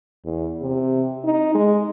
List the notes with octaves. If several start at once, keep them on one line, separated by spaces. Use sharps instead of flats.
E2
C3
D#4
G#3